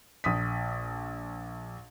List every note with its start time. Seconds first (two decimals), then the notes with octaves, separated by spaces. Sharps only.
0.24 A#1 D#6 B6